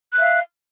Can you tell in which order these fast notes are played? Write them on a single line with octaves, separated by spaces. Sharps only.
F#6 E5 F5